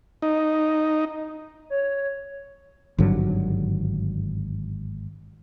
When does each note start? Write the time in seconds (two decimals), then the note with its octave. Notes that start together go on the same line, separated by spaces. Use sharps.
0.22 D#4
1.70 C#5
2.98 G#1 G2 D3 F#3